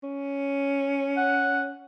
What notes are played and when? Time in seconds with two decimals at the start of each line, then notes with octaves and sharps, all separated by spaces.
0.03 C#4
1.17 F#5